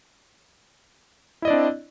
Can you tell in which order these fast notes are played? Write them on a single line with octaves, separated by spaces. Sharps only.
E4 D#5 D5 D4 C4